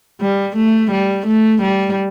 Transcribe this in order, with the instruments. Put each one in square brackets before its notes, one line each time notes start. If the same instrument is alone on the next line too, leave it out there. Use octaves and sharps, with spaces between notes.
[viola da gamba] G3
A3
G3
A3
G3